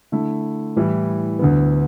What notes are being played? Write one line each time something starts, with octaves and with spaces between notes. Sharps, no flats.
D3 A3 E4
A2 E3 G3 E4
D2 D3 B3